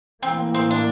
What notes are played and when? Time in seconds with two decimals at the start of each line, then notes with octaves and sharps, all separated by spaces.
0.23 A2 E3 A#3 C4
0.54 C4
0.71 D4